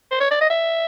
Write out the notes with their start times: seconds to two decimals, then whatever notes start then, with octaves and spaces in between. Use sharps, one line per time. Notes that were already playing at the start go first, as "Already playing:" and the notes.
0.11 C5
0.20 C#5
0.31 D5
0.41 D#5
0.50 E5